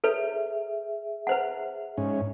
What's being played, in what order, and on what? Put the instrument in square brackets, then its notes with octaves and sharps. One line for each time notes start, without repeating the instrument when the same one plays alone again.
[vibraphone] G#4 E5 [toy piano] A4 B4 C#5
[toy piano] B4 C5 F#5
[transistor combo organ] G#2 C#4